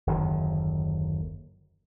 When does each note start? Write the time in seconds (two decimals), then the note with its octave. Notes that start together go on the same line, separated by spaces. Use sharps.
0.07 F#1 D#2 D3 D#3